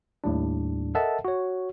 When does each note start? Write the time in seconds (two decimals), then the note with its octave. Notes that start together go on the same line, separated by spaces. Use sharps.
0.24 D#2 A2 G3 D4
0.95 A4 A#4 D#5 E5 F#5 A5
1.25 F#4 C#5